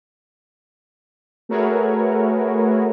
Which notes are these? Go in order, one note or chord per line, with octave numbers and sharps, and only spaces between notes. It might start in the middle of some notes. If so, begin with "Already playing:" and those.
A3 F#4 G#4 A#4 B4 C#5